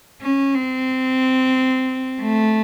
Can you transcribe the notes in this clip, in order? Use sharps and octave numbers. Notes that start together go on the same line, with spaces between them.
C#4
C4
A3